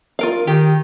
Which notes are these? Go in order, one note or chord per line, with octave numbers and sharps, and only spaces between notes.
F4 A#4 F5
D#3 G4